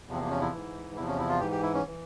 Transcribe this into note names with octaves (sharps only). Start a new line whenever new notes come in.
E2 C3 F3
C4
A#3
C#4
E4
G#2 E3
E2 C3 F3 E4
C#4
E4
F4
G#2 E3 G4
G4
E4
C#4
E3